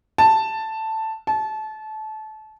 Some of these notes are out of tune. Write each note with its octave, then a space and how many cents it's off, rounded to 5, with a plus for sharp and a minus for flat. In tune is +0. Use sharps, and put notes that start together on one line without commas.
A5 +5
A5 -25